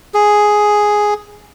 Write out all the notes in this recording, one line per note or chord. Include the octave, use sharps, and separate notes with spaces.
G#4